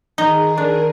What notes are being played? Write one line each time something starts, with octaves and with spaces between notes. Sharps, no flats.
D#3 D#4 G#4 A#5 G7
D4 A#4